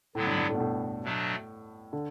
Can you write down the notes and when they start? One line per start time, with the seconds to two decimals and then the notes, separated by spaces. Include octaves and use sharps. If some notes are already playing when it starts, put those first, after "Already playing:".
0.15 A2 D3 F#3 B3 E4
0.27 G2
0.38 G2
0.49 A2
0.55 B2
0.60 A2
1.04 B2 F#3 A3 D4
1.93 D3